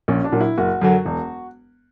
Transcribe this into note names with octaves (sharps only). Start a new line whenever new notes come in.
A#1 C#4
D4
A#2 F#3
E4
F#1 F#4
F#2 D3 F#3
E1